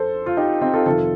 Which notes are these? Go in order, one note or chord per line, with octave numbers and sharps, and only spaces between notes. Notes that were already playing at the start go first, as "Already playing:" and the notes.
Already playing: F2 A4 C5
F4
D#4 G4
C4 D#4
F4 A4
F2 C3 D#3 F4 A4